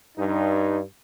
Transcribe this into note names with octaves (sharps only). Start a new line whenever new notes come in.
G2 D#4